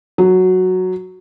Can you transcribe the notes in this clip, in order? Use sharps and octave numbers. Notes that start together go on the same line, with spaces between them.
F#3